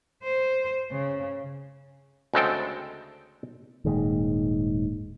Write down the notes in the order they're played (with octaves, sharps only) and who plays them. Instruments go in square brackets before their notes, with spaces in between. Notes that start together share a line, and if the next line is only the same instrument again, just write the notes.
[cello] C5
C#3
[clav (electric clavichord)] D2 C#3 G#3 C4 A4 G5
[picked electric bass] D#1 D#2 G#2 G#3